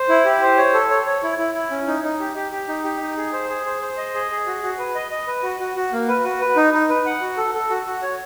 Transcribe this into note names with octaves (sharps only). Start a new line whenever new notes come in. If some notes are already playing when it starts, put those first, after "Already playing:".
Already playing: C5
E4
G4
C5
C#5
A4
C#5
C#5
E4
E4
E4
C#4
D#4
D#4
G4
G4
G4
D#4
G4
D#4
G#4
C5
G#4
C5
C5
D#5
G#4
G#4
F#4
F#4
B4
D#5
D#5
B4
F#4
F#4
F#4
A#3
B4
F#4
B4
D#4
D#4
B4
F#5
F#4
A4
A4
F#4
F#4
C#5